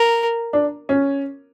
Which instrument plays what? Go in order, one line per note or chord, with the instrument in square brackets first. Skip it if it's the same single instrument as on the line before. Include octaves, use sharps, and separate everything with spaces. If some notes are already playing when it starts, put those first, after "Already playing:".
Already playing: [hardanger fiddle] A#4
[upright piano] D4
C#4